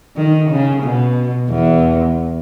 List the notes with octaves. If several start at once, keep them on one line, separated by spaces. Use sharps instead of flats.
D#3
C#3
B2
E2